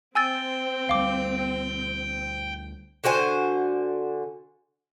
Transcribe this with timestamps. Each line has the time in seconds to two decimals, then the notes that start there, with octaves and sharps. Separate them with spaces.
0.15 C4 G5 G#5 E6 A6
0.89 D2 G3 F5 D6
3.04 D3 F#4 C5 G#5